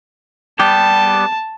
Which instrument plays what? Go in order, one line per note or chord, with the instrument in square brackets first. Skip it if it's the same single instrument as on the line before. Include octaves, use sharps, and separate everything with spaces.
[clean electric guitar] G3 B3 G4 [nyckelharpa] A5